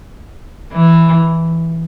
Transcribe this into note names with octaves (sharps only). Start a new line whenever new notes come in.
E3